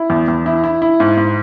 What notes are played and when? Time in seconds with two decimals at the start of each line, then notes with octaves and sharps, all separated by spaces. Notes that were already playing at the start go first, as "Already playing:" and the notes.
Already playing: E4
0.10 E2
0.28 E2
0.46 E4
0.64 E4
0.82 E4
1.00 G#2
1.17 G#2